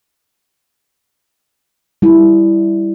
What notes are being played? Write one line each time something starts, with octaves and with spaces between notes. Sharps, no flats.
G3 E4